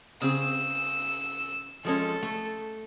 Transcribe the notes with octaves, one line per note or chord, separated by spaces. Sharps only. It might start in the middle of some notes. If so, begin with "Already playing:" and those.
C#3 C4 G#4 E6
F3 G#3 C#4 A4
A3